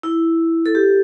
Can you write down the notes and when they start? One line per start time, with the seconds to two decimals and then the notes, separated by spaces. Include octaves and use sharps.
0.03 E4
0.66 A4
0.75 G4